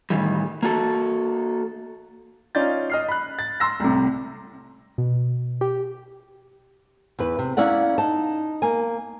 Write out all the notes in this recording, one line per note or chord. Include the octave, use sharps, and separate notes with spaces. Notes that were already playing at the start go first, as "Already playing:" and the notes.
A2 D#3 E3 G3
A#3 F#4 A4
C#4 D#4 F4 D5 G6 A6
D#5 F6 C7
B5 F#6
A6
C6 E6 A#6
C2 A2 C3
B2
G4
E2 E3 B4
C3
A#3 C#4 E4 D5 F#5
D#4 A5
A#3 G#5